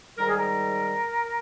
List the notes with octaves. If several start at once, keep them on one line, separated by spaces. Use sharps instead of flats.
G#2 D#3 G3 A#4
G#4
A#4